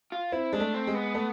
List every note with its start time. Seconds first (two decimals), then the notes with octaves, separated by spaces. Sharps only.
0.12 F4
0.32 C4 E4
0.53 G#3 D4
0.60 A3
0.74 C4
0.87 G#3
0.94 B3
1.15 A3